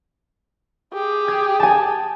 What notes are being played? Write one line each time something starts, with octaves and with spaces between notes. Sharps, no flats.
G4 G#4
G#6
G#5 A5